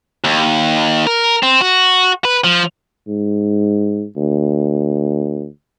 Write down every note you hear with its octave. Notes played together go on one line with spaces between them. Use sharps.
D#2
A#4
C4
F#4
B4
F3
G#2
D2